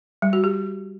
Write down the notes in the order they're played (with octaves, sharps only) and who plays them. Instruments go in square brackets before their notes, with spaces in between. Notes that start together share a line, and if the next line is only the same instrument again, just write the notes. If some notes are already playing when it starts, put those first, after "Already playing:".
[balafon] G3
F#4
G4